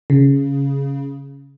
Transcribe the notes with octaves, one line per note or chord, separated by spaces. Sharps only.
C#3